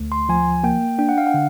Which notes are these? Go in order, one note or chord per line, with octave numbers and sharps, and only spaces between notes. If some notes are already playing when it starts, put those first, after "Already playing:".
Already playing: D2 A3
C6
F3 G#5
A#3 G5
D4 G5
F#5
F5
F#5
D3